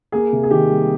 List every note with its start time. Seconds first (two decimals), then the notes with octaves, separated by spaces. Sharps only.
0.12 A#3 G#4
0.33 C3
0.43 G#4
0.51 D#3 G4
0.70 G3